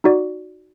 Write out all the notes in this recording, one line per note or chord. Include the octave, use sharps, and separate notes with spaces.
D#4 F#4 D5